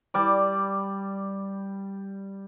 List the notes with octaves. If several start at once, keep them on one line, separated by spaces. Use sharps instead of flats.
G3 D5